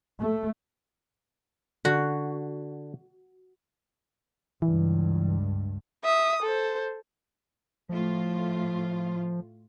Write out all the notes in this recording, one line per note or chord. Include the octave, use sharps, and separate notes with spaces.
A3
D3 F#4
C#2 G2 E3
E5 D#6
A4 C5
A2 F3 A3 F4